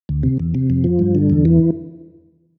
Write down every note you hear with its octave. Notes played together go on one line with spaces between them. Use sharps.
D2
C3
E2
C3
F2
F3
G2
D3
E2
E3